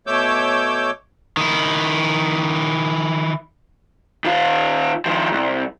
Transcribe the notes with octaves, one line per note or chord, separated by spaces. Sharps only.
B2 A3 C#5 D6 E6 G6
D#3 E4
D#3 F4
D#3 F3
C2